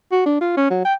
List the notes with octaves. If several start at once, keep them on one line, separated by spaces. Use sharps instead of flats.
F#4
D4
F4
C#4
F#3
G5